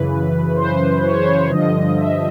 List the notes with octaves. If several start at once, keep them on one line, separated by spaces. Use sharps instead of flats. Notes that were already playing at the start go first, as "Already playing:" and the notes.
Already playing: F#2 C#3 E3 B4
C5
C#5
C5
C#5
G2 D3 F3 D#5
E5